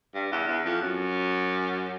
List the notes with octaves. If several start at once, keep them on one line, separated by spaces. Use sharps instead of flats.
G2
E2
E2
F2
F#2